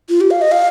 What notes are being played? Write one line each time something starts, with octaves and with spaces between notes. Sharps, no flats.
F4
G4
F5
D#5
F5